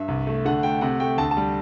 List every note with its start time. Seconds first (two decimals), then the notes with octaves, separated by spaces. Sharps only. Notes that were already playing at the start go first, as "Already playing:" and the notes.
Already playing: G2 E5
0.08 C2
0.27 A3
0.45 D3 F#5
0.63 A3 G5
0.81 C3 F#5
1.00 A3 G5
1.18 D2 A5
1.31 A5
1.37 G3